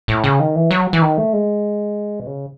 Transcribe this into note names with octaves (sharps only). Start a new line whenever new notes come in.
A2
C#3
D#3
E3
F#3
E3
D#3
A3
G#3
B2
C#3